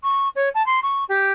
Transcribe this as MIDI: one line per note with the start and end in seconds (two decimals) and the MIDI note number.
0.03 0.29 85
0.36 0.49 73
0.55 0.65 81
0.66 0.80 84
0.83 1.04 85
1.09 1.32 67